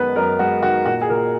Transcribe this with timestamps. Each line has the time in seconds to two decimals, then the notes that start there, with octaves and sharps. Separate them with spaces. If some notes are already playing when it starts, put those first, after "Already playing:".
Already playing: F#2 D#3 G#3 B3 B4
0.16 F#2 A#4
0.39 G#3 F#4
0.63 D#3 F#4
0.85 A#2 F#4
1.02 G#4
1.09 A#2 A#4